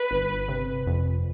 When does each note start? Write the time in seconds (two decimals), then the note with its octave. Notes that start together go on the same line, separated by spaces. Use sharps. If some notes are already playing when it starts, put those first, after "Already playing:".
Already playing: B4
0.11 G1
0.49 C3
0.87 F2